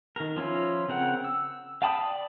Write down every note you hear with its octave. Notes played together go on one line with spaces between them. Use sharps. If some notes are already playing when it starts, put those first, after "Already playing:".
D#3 A#4
F3 C#4 E4 F4
C#3 C4 A#4 F#5
E6
F5 G5 A5 B5 D#6
D5